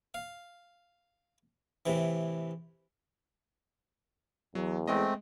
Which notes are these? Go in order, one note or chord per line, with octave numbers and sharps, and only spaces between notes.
F5
A2 C3 E3
E2 F#3
G#3 A3 C4 D#5